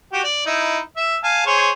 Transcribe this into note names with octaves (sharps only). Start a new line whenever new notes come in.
F#4 G4
D5
D#4 E4
E5
F5 G#5 A5
G#4 C5 C#5